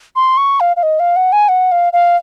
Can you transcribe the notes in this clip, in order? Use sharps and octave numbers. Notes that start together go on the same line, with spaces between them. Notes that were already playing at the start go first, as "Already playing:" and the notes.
C6
C#6
F5
F5
D#5
F5
F#5
G#5
F#5
F5
F5